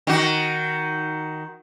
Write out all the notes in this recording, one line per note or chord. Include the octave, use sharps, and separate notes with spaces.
D#3 F#4